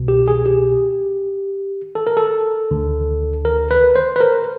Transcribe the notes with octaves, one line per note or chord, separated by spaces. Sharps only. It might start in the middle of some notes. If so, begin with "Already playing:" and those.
Already playing: C2 B2
G4
G#4
G4
A4
A#4
A4
D2 D3
A#4
B4
C5
B4
A#4